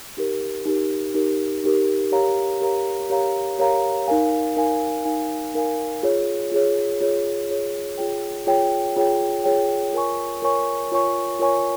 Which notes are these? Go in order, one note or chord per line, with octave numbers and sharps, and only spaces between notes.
D#4 G4 A#4
D#4 G4 A#4
D#4 G4 A#4
D#4 G4 A#4
G4 A#4 C#5 F5 A#5
G4 A#4 C#5 F5 A#5
G4 A#4 C#5 F5 A#5
G4 A#4 C#5 F5 A#5
D#4 A#4 F5 G#5
D#4 A#4 F5 G#5
D#4 A#4 F5 G#5
D#4 A#4 F5 G#5
F4 G#4 C#5
F4 G#4 C#5
F4 G#4 C#5
F4 G#4 C#5
F4 G#4 C#5 G5
F4 G#4 C#5 G5
F4 G#4 C#5 G5
F4 G#4 C#5 G5
F4 A#4 C#5 G#5 C#6
F4 A#4 C#5 G#5 C#6
F4 A#4 C#5 G#5 C#6
F4 A#4 C#5 G#5 C#6